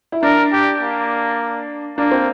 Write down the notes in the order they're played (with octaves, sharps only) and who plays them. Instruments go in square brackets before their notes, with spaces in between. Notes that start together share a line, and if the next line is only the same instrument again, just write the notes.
[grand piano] E4
[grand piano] D4 [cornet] A#4
[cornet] G4
A#3
[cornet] A#3 [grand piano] D4
[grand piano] C4